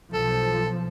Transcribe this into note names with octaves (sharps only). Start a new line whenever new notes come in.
B1 F3 A4